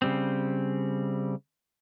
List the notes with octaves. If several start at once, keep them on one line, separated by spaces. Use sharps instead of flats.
C#3 G3 C4